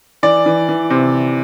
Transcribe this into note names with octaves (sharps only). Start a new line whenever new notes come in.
E3 D5
E3
E3
C3